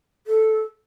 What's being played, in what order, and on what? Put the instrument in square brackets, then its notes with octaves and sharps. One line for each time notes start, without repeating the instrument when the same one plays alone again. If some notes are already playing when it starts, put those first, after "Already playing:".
[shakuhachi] A4